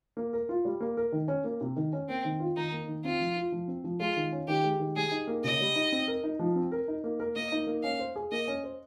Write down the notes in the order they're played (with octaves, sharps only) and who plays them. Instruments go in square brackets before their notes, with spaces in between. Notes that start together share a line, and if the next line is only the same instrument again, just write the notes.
[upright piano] A#3
A#4
F4
G3
A#3
A#4
D#3
C#4
A#3
C3
D#3
C#4
[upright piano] A#3 [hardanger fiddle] C4
[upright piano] D#3
F4
[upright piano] D#3 [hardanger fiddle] D#4
[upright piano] A#3
D#3
[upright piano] C4 [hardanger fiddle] F4
[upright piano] F3
F4
F3
C4
F3
[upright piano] G#3 [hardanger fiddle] F4
[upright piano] D#3
C#4
[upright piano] D#3 [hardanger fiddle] G4
[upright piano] G#3
D#3
[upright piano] G3 [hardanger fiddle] G#4
[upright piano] D#4
A#3
[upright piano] C#3 [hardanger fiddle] D#5
[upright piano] G3
D#4
C4
A#4
D#4
F3
C4
A#4
D#4
A#3
A#4
[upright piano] A#3 [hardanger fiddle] D#5
[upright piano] D#4
A#3
[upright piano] C#4 [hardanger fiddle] F5
[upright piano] C5
G#4
[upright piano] A#3 [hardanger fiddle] D#5
[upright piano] C#4
C5